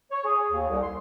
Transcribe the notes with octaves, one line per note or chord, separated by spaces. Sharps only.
C#5
G#4
D#2
C2
C6